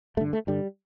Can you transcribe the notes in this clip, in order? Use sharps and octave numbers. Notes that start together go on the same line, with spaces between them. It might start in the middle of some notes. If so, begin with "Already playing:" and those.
G2 D3 A3
A3
G2 D3 G3